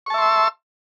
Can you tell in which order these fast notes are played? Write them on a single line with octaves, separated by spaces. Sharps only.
C#6 A5 E5 C6 E6